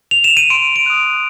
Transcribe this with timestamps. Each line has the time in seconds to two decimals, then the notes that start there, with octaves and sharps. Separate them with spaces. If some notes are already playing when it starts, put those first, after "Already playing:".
0.11 F7
0.24 E7
0.37 D#7
0.50 C6 D7
0.76 D7
0.86 D#6 F#6 D#7